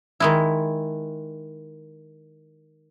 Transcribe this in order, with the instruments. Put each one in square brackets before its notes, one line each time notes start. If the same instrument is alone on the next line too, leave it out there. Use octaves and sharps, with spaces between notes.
[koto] D#3 G#3 E4